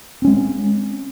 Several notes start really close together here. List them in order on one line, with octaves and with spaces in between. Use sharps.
C4 C#4 G#3